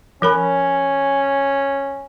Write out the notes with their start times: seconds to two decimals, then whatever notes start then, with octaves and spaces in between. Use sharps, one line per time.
0.22 F3 C#4 A#4 B5